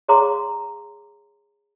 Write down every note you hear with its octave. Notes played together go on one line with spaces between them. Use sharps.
G#4 C#5 F5 A#5 C6 D6